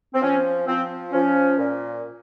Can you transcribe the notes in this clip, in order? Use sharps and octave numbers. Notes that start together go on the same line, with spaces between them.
C4
F3 C#4
F3 C4
F3 C#4
A#2